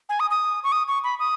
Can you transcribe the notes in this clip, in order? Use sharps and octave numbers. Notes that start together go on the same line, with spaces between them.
G#5
D#6
D#6
C#6
D#6
C#6
B5
D#6